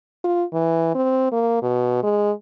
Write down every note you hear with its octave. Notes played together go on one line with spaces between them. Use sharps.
F4
E3
C4
A#3
B2
G#3